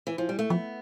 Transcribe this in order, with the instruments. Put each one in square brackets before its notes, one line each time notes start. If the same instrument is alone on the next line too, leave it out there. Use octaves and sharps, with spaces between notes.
[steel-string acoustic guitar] E3
F3
G3
A3
[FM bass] F3 [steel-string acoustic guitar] B3